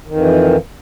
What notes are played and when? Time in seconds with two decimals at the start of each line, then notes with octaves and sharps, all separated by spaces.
0.07 D#3
0.12 F2
0.16 E3